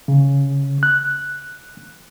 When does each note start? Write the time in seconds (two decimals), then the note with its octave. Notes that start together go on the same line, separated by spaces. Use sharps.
0.08 C#3
0.83 F#6